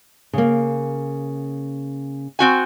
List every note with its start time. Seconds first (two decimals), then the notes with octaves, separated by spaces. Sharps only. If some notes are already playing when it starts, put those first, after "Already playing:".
0.33 C#3 A#3
2.39 C4 F#4 G#5